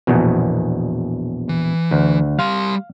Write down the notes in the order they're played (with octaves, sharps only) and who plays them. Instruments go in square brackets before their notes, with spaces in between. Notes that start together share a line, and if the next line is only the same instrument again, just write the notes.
[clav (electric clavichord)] A#1 E2 B2
[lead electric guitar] E3
[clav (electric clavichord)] D2
[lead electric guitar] G3 C6 [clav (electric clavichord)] F5